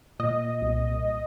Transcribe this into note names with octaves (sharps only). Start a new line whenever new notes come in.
A#2 D#5
C2